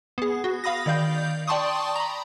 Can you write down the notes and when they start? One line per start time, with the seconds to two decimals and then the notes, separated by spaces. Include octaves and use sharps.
0.18 B3 G#4
0.44 F#4
0.64 F5 B5 D#6 A#6
0.86 D#3 D5 F5 G6
1.47 D5 G5 A5 C6 C#6 D#6
1.96 A#5 B5